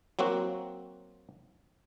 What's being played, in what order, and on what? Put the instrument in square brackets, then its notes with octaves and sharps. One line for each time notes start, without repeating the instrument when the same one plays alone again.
[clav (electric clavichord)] F#3 A#3 C4 F#4